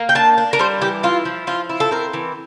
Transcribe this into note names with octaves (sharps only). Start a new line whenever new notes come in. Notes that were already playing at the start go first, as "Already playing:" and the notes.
Already playing: A#3
G5
D4 A5
D4
A#4
G3 C5
E3 G4
E4 F4
F3
F3 F4
E4
A4
C4 A#4
E3